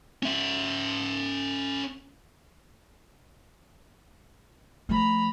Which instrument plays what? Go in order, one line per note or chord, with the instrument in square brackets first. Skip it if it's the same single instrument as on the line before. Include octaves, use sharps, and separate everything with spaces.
[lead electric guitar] C#4 E5
[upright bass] F3 A3 [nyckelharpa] A#5 B5